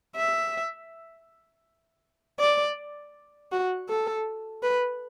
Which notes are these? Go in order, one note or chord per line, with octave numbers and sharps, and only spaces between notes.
E5
D5
F#4
A4
B4